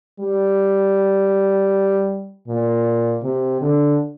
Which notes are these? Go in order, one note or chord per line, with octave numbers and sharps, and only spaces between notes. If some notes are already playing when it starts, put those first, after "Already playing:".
G3
A#2
C3
D3